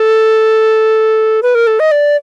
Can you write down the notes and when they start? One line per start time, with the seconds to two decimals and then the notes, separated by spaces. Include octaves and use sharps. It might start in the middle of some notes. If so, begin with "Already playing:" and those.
Already playing: A4
1.42 B4
1.55 A#4
1.67 A4
1.79 D#5
1.91 D5